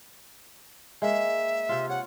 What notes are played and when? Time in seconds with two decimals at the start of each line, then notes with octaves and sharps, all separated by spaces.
1.02 G#3 A#3 E5
1.69 C3 F4
1.89 C#5 F#5